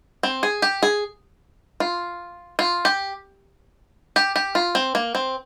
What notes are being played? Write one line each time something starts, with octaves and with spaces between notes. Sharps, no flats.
C4
G#4
G4
G#4
F4
F4
G4
G4
G4
F4
C4
A#3
C4